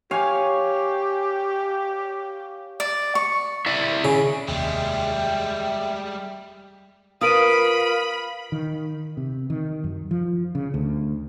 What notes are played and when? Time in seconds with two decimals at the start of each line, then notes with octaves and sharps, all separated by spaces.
0.11 G4 C#5 F5 G#5
2.80 D5
3.15 C#6
3.66 E4 D5 E5
4.05 C#3
4.48 F1 D#2 G3 G#3 E5 G5
7.21 F4 A#4 B4 F5 B5 D#6 D7 D#7
8.52 D#3
9.17 C3
9.50 D#3
9.84 F#2
10.11 F3
10.55 C#3
10.74 D2